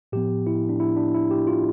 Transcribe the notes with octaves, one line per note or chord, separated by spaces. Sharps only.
A2 F3 B3 G4
E4
D4
E4
D4
E4
G4
F4